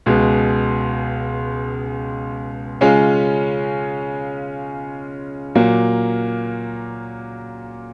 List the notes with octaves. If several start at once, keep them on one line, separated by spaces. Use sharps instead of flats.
C#2 B2 G#3
C#3 G#3 C#4 F4
A#2 F#3 A#3